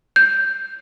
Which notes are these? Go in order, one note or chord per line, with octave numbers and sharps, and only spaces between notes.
G6